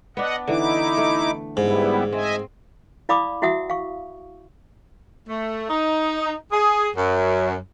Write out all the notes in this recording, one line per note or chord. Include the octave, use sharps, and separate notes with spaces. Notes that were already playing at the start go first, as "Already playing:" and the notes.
B3 D4 D#5 F#5
D3 E3 D#4 E4 D6
A3
G#2 G3 B3 E4
C4 D#5 E5 G#5
E4 D5 F5 B5 D6 D#6
E4 F#4 E5 F#5 D#6
F5 C#6
A3
D#4
G#4
F#2